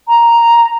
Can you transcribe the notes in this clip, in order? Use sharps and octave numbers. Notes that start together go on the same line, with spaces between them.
A#5